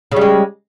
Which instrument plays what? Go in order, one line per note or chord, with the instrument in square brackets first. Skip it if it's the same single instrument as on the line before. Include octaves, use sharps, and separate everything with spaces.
[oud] C#3
G3
G#3